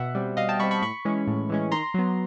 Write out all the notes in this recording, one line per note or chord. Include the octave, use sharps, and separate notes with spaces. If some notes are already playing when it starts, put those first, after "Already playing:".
Already playing: B2 E5 F#5
G3 C4
B2 D#5 F5
G5 A5
G3 C4 B5 C#6
B5 C#6
A2 B5 C#6
E3 G#3 C#4
A2
E3 G#3 C#4
D#3 A#5 C6
F#3 B3